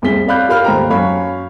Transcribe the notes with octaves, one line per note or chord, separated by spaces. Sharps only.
F1 C2 C4 G#4 B6 G7
C#5 D5 F5 B5 F#6 G6
G4 A#4 F5 B5 F6
D#2 G#2 A3 C5 G5 A#5
F#2 C#5 F5 B5 C#6